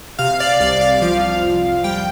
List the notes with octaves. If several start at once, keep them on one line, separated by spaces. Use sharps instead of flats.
C3 F5
D5
C2 D5
F5
F3 F5
F2
G3 G5